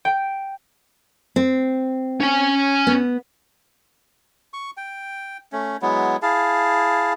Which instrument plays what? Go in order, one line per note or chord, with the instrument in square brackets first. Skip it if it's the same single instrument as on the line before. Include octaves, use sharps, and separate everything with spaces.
[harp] G5
[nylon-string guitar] C4
[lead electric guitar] C#4 G#5
[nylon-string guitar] B3
[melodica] C#6
G5
A3 C#4
F#3 G#3 B3 E4
E4 G#4 F5 A5